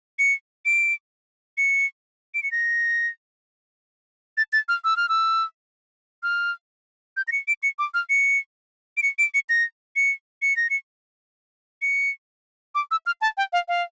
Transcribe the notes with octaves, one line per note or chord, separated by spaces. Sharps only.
C#7
D7
C#7
D7
C#7
A#6
A6
A6
F6
E6
F6
E6
F6
G6
A#6
C#7
D7
C#7
D6
F6
C#7
D7
C#7
D7
C#7
A#6
C#7
C#7
A#6
C#7
C#7
D6
E6
F6
A5
G5
F5
F5